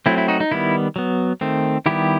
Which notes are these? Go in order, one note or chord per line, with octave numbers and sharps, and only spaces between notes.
F#3 A3 C4 E4
E4
D#4 F#4
D#4
D#3 G3 B3 E4
F#3 B3
D#3 A3 C4
D#3 G3 B3 E4 G4